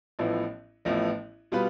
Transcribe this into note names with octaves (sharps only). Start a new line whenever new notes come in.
A1 A2 F3 B3 E4
A1 A2 F3 B3 E4
B2 G3 B3 F4 B4